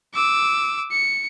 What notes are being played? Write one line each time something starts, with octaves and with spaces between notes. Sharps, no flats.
D6 E6
C#7